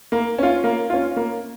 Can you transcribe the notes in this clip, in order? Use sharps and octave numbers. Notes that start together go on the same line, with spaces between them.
A#3
C#4 F4
A#3
C#4 F4
A#3